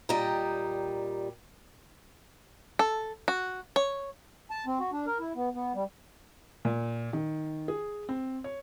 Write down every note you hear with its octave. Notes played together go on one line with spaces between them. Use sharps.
A#2 G3 D#5 G5 A#5
A4
F#4
C#5
A5
C4
F#4
D4
A#4
E4
B3
B3
G3
A#2
D#3
G#4
C4
C#5